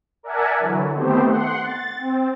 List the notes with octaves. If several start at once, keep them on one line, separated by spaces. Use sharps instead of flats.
A#4 D5 E5 F#5 G#5 A5
D3 E3 F#3
D#3 A3 B3 C4 G4 C5
F#5 C6
A6
C4